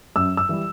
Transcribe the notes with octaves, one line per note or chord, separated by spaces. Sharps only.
F#2 E6
E6
E3 G3